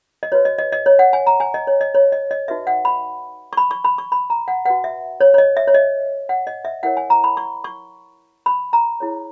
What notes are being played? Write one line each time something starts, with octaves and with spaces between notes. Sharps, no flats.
D#5
F#4 B4 C#5
D#5
D#5
D#5
C#5
F#5
G#5
A#5
G#5
D#5
C#5
D#5
C#5
D#5
D#5
D#4 F#4 B4 E5
F#5
B5
C#6
B5
C#6
B5
C#6
B5
A#5
F#5
F#4 B4 F#5
E5
C#5
C#5
D#5
E5
C#5
D#5
F#5
D#5
E5
E4 A#4 C#5 F#5
G#5
A#5
B5
C#6
C#6
B5
A#5
E4 G#4 C#5